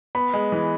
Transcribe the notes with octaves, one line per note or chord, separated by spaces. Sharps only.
B3 B5
G#3
E3